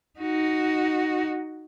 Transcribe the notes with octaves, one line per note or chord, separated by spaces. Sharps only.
D#4 F#4